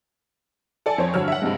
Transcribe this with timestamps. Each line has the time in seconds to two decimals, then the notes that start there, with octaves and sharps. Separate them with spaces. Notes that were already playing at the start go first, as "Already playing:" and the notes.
0.86 A4 D5 G#5 A5
0.98 F2 C5 C#5
1.14 G2 D3 F#3 C#5 E6 F6
1.28 E5 F#5
1.42 G2 C3 G#3